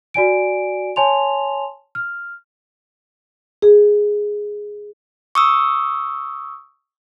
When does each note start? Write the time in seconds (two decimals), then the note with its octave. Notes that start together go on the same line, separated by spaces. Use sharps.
0.14 F#4 D5 G#5 D7
0.96 C#5 G#5 A5 C6 F7
1.95 F6
3.62 G#4
5.35 C#6 D#6 E6